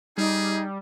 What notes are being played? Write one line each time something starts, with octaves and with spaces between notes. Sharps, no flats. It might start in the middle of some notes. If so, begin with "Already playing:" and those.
G3 D#4 G#4